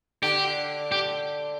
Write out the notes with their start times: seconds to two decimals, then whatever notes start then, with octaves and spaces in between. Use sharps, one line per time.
0.22 D3 G4
0.92 G4